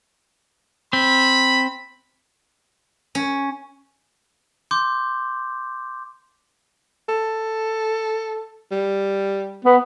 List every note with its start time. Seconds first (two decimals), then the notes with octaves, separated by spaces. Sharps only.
0.93 C4 B5
3.15 C#4
4.71 C6 D6 G6
7.09 A4
8.71 G3
9.65 B3